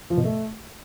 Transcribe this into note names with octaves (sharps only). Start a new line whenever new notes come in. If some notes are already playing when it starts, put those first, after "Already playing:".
F3
B2
A3